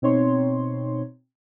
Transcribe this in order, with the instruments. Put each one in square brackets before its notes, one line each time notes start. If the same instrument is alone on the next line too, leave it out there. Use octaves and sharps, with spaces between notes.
[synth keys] B2 C4 D#4 C#5 C6